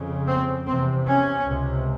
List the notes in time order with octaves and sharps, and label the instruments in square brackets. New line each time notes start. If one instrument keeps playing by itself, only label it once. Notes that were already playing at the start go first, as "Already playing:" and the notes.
Already playing: [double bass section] F2 C#3
C4
E2 C3 C4
C#4
C#2 C3